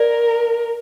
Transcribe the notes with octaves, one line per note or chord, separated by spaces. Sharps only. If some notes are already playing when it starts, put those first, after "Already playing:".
Already playing: A#4 D5